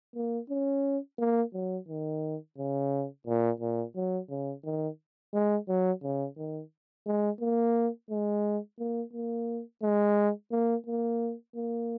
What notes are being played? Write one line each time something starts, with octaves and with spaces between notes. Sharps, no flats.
A#3
C#4
A#3
F#3
D#3
C#3
A#2
A#2
F#3
C#3
D#3
G#3
F#3
C#3
D#3
G#3
A#3
G#3
A#3
A#3
G#3
A#3
A#3
A#3